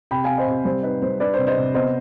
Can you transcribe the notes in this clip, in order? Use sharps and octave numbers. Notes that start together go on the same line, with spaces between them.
C3 G5 B5
C4 F5 G#5
C5 D#5
C3
G3 C5
D#4 B4
G3 C5
D4 B4 D5
C5
C3
C5 D#5
C3
B3 C5 D#5